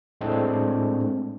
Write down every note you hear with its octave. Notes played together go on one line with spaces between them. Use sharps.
A2 G#3 A3 C4 D4